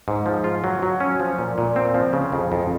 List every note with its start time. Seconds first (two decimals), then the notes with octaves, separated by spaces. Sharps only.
0.08 G#2
0.26 F3
0.44 F4
0.64 F#3
0.82 F#3
1.00 C#4
1.20 F3
1.39 A#2
1.58 A#2
1.76 C4
1.94 F3
2.13 C#3
2.32 F2
2.52 F2